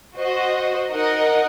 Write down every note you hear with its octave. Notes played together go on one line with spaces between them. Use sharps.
F#4 C5 D#5
D#4 A#4 D#5 F#5